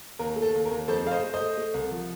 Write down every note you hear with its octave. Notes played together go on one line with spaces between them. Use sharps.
D#2 A#4
A3
A4
D#2
A#4
D#2
F2 A4 C5
A3 F5
C5 D#5
A3
C5 D#5
A3
A3
C2
F3